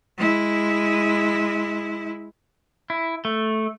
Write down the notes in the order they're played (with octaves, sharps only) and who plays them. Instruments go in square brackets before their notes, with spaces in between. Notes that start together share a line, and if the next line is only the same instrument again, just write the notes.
[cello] G#3 E4
[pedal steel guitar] E4
A3